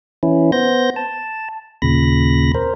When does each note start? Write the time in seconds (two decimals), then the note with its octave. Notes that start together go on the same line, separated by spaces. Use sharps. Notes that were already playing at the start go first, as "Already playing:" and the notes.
0.23 E3 C#4 E4
0.52 B3 C5 G6 A#6
0.96 A5
1.82 D#2 A#2 C#3 B5 A#6
2.54 A#4 C5